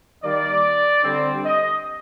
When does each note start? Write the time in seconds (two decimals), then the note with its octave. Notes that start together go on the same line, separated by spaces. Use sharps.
0.23 D#3 G3 A#3 D5
1.04 D3 G3 C4
1.44 D#5